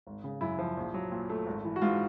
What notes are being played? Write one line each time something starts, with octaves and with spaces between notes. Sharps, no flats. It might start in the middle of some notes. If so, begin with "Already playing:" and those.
G#1
C#3
F#2 E4
F3
A#1
F#3
A#2
A3
G#1
E3
F#4
G#2 F4